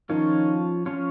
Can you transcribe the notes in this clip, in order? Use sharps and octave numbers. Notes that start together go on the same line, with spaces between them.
D#3 F3 C#4 F4 C#5
F3 C#4 F4 C#5